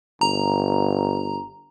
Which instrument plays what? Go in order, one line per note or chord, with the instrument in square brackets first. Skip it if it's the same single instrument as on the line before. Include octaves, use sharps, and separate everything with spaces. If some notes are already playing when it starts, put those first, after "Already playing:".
[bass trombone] G1 [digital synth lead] A#5